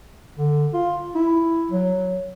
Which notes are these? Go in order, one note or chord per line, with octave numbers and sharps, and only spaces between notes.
D3
F4
E4
F#3